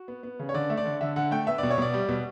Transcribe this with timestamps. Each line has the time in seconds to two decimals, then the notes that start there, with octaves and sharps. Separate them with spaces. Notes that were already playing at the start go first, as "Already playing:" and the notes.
Already playing: F#4
0.08 B3
0.23 B3
0.39 C#3
0.49 C#5
0.54 D3 D5
0.70 A3 E5
0.77 D5
0.85 D3
1.01 D3 E5
1.16 D3 F#5
1.31 A3 G5
1.47 B3 E5
1.58 B2 D5
1.71 C#5
1.78 B2 D5
1.94 G3
2.09 B2